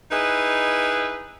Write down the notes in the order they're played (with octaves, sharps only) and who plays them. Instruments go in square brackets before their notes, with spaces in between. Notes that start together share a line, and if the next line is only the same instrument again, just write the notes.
[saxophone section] D#4 E4 G#4 B4 D#5